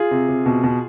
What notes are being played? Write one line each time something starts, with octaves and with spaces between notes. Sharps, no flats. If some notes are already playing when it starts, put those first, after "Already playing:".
Already playing: F4 G#4
C3
C3
B2
B2